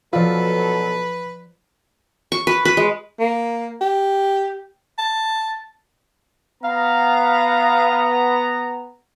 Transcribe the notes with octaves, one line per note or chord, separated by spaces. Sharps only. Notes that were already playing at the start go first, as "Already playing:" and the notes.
B2 F3 F#3 F4 A4 B4 D5 E6
C#6
B4
B4
G#3
A#3
G4
A5
B3 F5 A#5